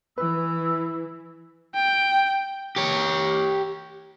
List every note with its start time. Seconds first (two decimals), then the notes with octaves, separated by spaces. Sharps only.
0.18 E3 B4 E6
1.75 G5
2.76 G4 C#5